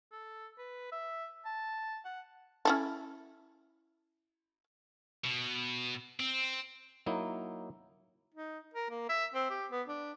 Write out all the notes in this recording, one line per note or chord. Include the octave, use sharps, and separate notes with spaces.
A4
B4
E5
A5
F#5
C#4 E4 A4
B2
C4
F#3 A#3 D#4 E4
D#4
A#4
A#3
E5
C4
G4
B3
D4